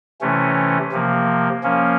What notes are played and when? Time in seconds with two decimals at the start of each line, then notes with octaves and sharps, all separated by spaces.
0.21 C3 E3 A3 C#4
0.92 C3 F3 A#3
1.63 F3 A#3 C#4